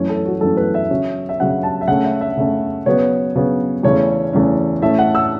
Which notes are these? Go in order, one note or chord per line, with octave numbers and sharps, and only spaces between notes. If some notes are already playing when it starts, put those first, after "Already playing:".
Already playing: F#2 E3 A3 C#4 C#5
A4
F#4
F#2 E3 A3 C#4 A4
B4
E5
C#3 F#3 C#4
E5
C#3 F#3 C#4 F#5
A5
E5
C#3 A3 C#4 F#5
E5
E5
C#3 A3 C#4
C#3 F#3 B3 C#5
C#3 F#3 B3
E2 C#3 A3 C#4 C#5
E2 C#3 A3 C#4
A2 A3 C#4 E5
F#5
E6